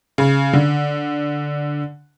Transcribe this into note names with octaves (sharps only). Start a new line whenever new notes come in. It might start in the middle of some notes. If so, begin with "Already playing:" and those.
C#3
D3